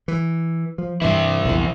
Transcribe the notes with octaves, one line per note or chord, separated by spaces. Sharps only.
E3
F3
G2 C3 E3 E4
A#1 E2